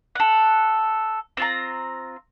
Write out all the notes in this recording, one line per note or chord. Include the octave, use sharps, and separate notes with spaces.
A4 F#5
C4 F4 A#5